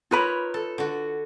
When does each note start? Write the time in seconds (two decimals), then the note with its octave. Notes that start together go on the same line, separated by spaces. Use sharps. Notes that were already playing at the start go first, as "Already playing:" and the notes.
0.11 D#4 F4 A#4 B4 C#5 B5
0.54 A4
0.78 D3 F#4